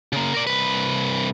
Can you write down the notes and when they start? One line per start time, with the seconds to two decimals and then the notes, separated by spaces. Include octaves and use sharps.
0.13 C#3 A#3
0.34 A#4 D5
0.47 C2 B4